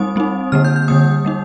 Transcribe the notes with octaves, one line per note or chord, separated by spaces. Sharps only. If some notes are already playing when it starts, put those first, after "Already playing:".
Already playing: G3 C4 D#4 D#6
G3 C4 D#4
D3 G3 A#3 F6
G6
G6
D3 G3 A#3 D#6
G3 A#3 D#4